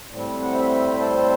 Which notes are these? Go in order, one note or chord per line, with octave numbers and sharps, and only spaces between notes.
A2 G3 C4
F#5
C5 E5
A4 C5